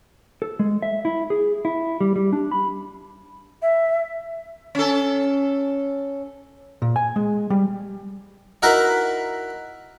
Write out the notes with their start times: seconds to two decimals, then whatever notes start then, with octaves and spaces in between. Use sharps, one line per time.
0.42 A4
0.59 G#3
0.82 E5
1.05 E4
1.30 G#4
1.65 E4
2.01 G3
2.16 G3
2.33 D4
2.51 B5
3.62 E5
4.75 C#4 A4
6.82 A#2
6.96 G#5
7.16 G#3
7.50 G3
8.62 D#4 E4 F#4 A#4 B4 E5